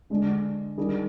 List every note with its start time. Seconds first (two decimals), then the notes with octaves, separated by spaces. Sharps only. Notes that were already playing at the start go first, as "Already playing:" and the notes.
0.10 D3 G#3 D4
0.77 D#3 G3 D4 G#4